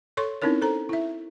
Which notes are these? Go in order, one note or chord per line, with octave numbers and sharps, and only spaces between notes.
A4 C#5 C6 C#6
C4 C#4 D#4 E4 A#4 C#5
A4 C5 A#5
E4 E5